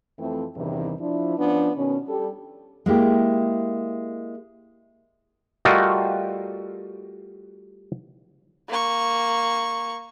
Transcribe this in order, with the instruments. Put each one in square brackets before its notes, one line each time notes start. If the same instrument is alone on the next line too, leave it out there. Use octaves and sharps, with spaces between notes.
[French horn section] F2 E3 A3 C4
E2 G2 C3 D#3 E3
F3 D4 E4
F3 B3 C#4 D4
B2 D#3 B3 C#4
G3 G4 A4
[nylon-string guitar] G#3 A#3 E4 G4
[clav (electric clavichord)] G3 A3 F4 F#4 A#4 D#5
[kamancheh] A#3 C#6